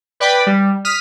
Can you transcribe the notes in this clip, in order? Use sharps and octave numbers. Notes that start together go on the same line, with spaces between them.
B4 D5 G5 B5
G3
D#6 F6 B6